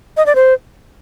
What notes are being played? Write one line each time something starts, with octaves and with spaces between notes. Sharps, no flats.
D#5
D5
C5